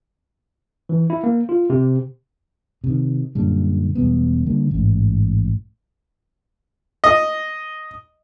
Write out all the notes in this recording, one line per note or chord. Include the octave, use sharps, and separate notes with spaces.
E3
E4
A#3
F4
C3
C3 D#3
F#2 A#2 D3 G3
E1 B2 G3 B3
D3 G3 A#3
A1 G#2
D#5